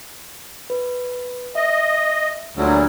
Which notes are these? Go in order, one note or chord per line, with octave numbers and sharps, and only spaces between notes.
B4
D#5 E5
D2 A#2 F#3 G3